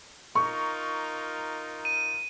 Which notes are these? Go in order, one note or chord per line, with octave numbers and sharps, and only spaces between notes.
D#4 F4 A#4 C#6
D#7